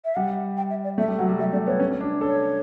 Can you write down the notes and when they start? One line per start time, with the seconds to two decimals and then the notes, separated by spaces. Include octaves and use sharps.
0.05 E5
0.16 G3 F#5
0.57 G5
0.70 E5
0.84 D5
0.98 A3 E5
1.08 G3
1.18 F#3 F#5
1.29 G3
1.39 G3 E5
1.52 A3 D5
1.66 B3 C#5
1.80 C#4
1.91 C#4
2.01 D4
2.21 A4 C#5